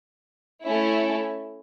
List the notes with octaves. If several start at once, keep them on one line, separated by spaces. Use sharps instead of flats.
A3 C#4 E4